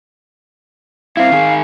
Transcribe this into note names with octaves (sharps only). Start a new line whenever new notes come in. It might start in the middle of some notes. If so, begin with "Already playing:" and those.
C4 E4 F5
D#3 G#4